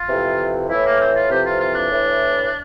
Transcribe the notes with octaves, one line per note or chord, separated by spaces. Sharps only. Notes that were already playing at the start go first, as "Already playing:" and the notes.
Already playing: F4
F2 C3 E3
A2 E3 E4
A#3
C4
F4
F2 C3 E3 G4
F4
F4
D4
A2 E3